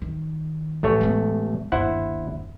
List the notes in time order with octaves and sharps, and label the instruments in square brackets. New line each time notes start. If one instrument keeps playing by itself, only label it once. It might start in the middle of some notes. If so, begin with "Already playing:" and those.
[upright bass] D#3
[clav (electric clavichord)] A1 A3 C#5 [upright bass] F3
[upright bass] G#3 B3
[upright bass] G1 D#2 [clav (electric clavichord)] E4 C5 F#5